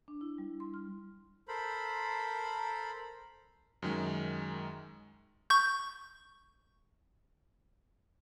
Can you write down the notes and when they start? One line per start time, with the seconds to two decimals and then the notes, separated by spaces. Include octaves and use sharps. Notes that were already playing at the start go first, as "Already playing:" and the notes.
0.08 D4
0.21 E4
0.38 G3
0.60 C6
0.74 F6
1.48 A4 A#4 C5 B5
3.82 F#2 D#3 G#3
5.50 C#6 G6